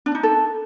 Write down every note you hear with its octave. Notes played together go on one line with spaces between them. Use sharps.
D4
D#4
A4